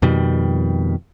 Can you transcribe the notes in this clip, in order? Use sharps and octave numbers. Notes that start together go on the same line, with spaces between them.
F2 B2 D#3 G3